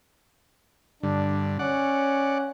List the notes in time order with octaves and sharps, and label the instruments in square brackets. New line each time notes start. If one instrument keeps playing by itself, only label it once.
[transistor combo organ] G2 D3 [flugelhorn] D4
[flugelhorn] C#4 [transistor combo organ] D5 F#5